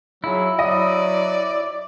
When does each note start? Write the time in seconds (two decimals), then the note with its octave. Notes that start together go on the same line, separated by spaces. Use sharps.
0.24 F#3 E4 F4 G#4
0.59 F#3 D5 D#5